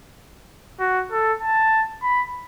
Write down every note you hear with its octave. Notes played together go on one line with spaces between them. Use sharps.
F#4
A4
A5
B5